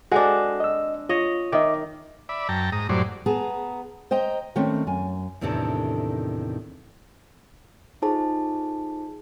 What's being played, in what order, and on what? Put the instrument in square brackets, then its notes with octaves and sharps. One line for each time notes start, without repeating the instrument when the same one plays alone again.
[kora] G#3 C4 D4 [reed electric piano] F#4 A4 F#5
[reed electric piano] D#5 E6
[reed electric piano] F4 [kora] C#5 D#5
[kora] D#3 [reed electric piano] D#5 E5 D6
[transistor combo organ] D5 E5 B5
F#2 G5 A5 A#5
G#2 A#5 D#6
F#2 A2 F#3 G3 C5 D5
[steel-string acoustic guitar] B3 G#4 B4 A5 A#5
C5 D#5 G5 A#5
D#3 A3 C4 C#4
F#2 G#5
[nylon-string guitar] E2 A2 C3 D#3 D4 A4
[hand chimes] D#4 F4 G#4 A4 C5 A5